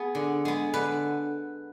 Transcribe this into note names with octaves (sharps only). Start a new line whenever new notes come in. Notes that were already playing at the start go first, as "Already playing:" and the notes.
Already playing: B3 G#4
D3
G#3 B3
D3 B4